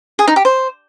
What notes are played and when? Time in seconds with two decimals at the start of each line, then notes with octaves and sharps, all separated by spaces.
0.19 G#4
0.28 D#4
0.36 G4
0.45 C5